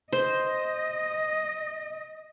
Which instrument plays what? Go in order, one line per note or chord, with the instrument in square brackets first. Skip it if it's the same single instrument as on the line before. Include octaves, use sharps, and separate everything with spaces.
[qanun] C5 [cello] D#5